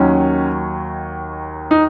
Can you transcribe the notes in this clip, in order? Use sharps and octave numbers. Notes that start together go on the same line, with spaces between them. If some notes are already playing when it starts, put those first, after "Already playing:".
Already playing: D#2 D#3 F#3 C#4
D#4